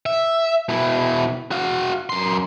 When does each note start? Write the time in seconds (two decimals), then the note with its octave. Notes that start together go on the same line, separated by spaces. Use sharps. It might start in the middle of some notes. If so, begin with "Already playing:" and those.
0.06 E5
0.69 B2 E4
1.51 F#4 F5
2.10 F#2 C6